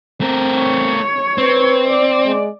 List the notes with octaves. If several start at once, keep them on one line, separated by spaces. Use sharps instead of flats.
A3 C4 A#4
C#5
C4 B4
D5
G#3